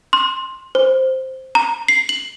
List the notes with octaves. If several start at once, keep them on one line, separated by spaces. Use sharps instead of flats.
C6
C5
A#5
C7
F#7